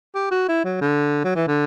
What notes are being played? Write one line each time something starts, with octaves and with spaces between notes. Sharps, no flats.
G4
F#4
E4
F#3
D3
F#3
E3
D3